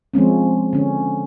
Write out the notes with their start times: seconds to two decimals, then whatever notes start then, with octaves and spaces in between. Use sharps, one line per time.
0.14 F3 G#3 C4 C#4
0.73 D3 C#4